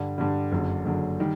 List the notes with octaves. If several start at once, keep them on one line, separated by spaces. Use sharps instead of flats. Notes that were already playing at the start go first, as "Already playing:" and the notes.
Already playing: G2 D3 G3
G2 D3 G3
F#1 F#2 D3
F#1 F#2 D3
D#3 G3